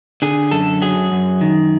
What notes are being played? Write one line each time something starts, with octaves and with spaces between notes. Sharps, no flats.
D3 G#4
F#2 A4
F#3 G#4
F#2
D#3